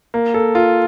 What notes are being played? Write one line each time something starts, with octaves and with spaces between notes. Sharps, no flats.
A#3
A4
F4